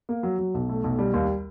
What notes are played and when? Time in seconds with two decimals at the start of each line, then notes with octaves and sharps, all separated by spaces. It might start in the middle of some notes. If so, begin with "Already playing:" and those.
0.09 A#3
0.23 F#3
0.39 F#3
0.54 B1
0.69 A3
0.84 B1
0.99 G3
1.14 D#2